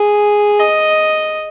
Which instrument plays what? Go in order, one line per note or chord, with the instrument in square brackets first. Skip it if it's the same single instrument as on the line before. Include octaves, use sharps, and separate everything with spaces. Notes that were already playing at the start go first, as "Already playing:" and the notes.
Already playing: [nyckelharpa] G#4
D#5